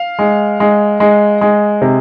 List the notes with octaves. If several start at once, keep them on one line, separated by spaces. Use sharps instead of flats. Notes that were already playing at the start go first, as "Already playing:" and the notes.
Already playing: F5
G#3
G#3
G#3
G#3
C3